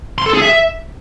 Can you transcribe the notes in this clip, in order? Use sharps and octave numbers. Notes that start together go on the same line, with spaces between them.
C6
A4
G#4
E5